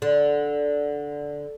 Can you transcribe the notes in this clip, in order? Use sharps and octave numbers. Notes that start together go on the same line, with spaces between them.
D3